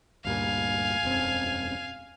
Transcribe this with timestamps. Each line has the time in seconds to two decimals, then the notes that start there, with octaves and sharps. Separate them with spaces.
0.25 D2 G2 A#2 F5 G#5
1.03 E1 F#2 C4